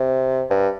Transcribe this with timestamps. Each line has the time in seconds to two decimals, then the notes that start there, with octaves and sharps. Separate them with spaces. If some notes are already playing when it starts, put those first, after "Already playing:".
Already playing: C3
0.50 G2